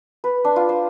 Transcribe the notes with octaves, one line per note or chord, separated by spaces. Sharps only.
B4
D4
F4
C5